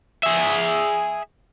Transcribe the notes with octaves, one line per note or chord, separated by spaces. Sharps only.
G#4 E5